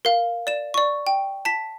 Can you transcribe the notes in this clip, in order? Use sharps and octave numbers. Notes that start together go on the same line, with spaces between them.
A#4 F5
D5 E7
D5 C#6
G5
A5 B6